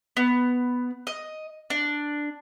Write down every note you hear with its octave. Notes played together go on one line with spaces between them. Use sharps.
B3
D#5
D4